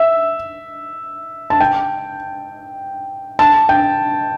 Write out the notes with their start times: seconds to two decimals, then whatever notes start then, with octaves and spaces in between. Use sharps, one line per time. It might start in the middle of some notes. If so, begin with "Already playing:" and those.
Already playing: E5
1.50 A5
1.60 G5
3.39 A5
3.69 G5